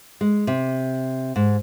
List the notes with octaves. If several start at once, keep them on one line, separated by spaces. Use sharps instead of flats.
G#3
C3
G#2